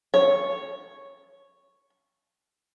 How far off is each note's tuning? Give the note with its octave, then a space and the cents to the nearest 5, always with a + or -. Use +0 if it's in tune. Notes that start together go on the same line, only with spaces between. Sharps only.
C#5 -5